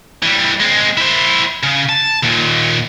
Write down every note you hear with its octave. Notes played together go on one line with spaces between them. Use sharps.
E3 G3
G#3 C4
E4 C5
C#3
A5
D#2 A#2